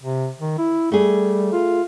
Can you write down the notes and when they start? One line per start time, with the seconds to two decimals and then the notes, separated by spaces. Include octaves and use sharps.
0.03 C3
0.40 D#3
0.58 E4
0.92 G3 A3 G#4
1.53 F4